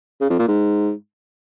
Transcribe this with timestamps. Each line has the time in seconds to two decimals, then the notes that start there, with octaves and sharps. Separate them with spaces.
0.21 C#3
0.30 F2
0.39 A#2
0.48 G#2